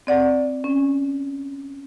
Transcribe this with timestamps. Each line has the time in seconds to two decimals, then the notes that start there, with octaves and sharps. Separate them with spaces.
0.07 C4 D5 F#5
0.64 C#4